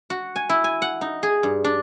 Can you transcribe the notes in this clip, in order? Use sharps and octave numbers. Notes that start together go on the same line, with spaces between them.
F#4
G#5
E4
G#5
F#5
D#4
G#4
G2
D4